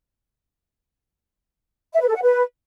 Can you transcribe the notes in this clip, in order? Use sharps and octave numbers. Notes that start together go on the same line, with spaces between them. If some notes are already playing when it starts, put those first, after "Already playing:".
E5
B4
A4
F#5
B4